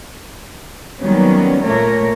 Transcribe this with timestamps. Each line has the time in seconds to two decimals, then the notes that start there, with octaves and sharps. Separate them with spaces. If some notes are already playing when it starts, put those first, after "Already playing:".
1.01 D#3 F#3 G3 A#3 B3 C#4
1.66 A#2 A3 A#3 A#4 C#5